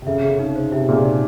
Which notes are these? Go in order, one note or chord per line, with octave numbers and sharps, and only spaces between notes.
C3
C#3 E5
G#4
C#3
D#4
C5
C3 E5
A#2 G#4
D#4